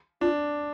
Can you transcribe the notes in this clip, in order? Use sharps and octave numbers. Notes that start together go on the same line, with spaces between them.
D4 F4